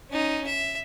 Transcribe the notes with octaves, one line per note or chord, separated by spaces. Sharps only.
C#4 D#4
E5